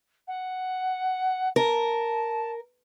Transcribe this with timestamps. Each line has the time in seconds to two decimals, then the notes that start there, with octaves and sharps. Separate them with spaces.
0.27 F#5
1.56 A#4 A5